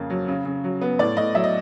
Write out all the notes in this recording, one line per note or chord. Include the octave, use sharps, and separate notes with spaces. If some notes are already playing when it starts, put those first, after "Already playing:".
Already playing: F2 C#3 A#3
F#3
C#3
C#3
F#3
B3
A2 D5
A2 D#5
F#3 E5
D#5